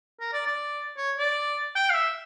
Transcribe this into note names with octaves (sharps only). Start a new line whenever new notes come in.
A#4
D5
D5
C#5
D5
G5
F5
E5